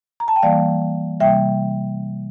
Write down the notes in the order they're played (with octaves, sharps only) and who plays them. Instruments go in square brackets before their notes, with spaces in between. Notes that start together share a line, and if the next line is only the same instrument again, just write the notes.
[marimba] A#5
A5
G5
E3 G3 A#3 D5 F5
C3 G3 A#3 E5 G5